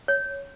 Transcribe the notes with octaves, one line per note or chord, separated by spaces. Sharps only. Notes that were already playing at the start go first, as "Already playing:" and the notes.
C#5